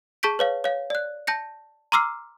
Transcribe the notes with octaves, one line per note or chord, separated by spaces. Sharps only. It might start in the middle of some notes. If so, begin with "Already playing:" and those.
G#4 A5 C#6 G6 B6 D7
B4 C#5 F5
C#5 F5
D5 F#6
A5 G6 A#6 C#7
A#5 C6 D6 E6 F6 C7